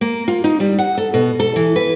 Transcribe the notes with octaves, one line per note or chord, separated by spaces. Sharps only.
A#3
F4
D#4
G3
F#5
A4
B2
A4
E3
B4